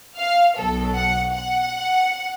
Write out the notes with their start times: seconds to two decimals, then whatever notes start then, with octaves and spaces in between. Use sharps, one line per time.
0.18 F5
0.56 B1 B2 F#3 A4
0.95 F#5
1.34 F#5